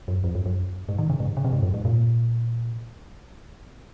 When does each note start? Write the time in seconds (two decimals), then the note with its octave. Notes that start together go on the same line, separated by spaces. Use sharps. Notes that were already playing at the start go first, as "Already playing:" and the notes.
0.08 F#2
0.24 F2
0.35 F#2
0.46 F#2
0.89 G#2
0.98 D#3
1.10 C#3
1.20 G#2
1.37 C#3
1.45 C3
1.53 G#2
1.63 F#2
1.74 G#2
1.85 A#2